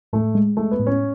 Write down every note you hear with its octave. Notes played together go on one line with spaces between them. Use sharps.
A2 A3
G#3
G#3 A3
B3
A2
C#4